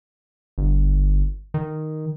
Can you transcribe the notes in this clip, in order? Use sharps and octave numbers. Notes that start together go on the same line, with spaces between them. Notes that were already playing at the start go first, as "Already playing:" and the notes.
G1
D#3